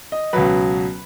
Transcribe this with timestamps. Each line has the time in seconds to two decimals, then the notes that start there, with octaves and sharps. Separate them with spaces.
0.12 D#5
0.33 C#2 B2 F#3 B4